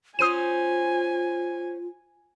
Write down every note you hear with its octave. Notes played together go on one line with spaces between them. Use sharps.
C#4 F4 C5 G#5 D#6 D#7